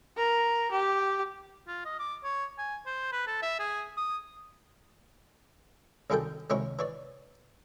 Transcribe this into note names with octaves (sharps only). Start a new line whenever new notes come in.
A#4
G4
F4
D#5
D6
C#5
G#5
C5
B4
A4
E5
G#4
D#6
C2 F#2 D#3 G#4 A4 G5
C#2 C3 D#3 C#4 E4 C#5
E3 C#5 D5